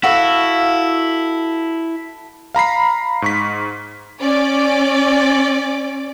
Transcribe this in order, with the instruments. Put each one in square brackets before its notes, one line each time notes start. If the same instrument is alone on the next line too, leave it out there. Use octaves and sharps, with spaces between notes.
[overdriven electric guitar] E4 [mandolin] F#4 A4 F5
[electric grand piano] F5 A#5 B5 C7
G#2 C#6 B6
[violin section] C#4 D5